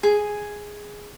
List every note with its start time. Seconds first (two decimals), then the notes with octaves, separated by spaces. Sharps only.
0.03 G#4 G#5